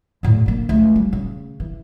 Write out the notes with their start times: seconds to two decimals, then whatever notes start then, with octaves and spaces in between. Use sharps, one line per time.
0.23 E2 A2
0.46 D3 A#3
0.69 C#2 A3
0.96 G3
1.13 C#3
1.60 E3